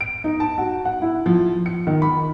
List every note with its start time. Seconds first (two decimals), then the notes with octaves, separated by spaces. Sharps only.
0.01 D7
0.24 D#4
0.40 A5
0.58 F#4
0.85 F#5
1.02 E4
1.26 F3
1.66 C#7
1.87 D#3
2.02 B5